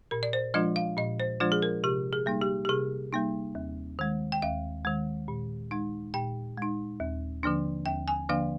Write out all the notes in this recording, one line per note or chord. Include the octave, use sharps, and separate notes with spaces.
A#2 A#4
D5
C5
F3 G#3 D4 F4 D#5
F5
A#2 D#5
C5
F3 G#3 D4 F4 C5
G#4
A#4
C3 G4
G#4
G3 A#3 D#4
G4
G4
C3 G#4
G3 A#3 D#4
D#2
D#3 G#3
G5
D#2 F5
D#3 G#3
A#2
G#3 D#4
A#2 G5
G#3 D#4
D#2
D3 F3 A#3 D4
D#2 G5
G#5
D3 F3 A#3 D4 F5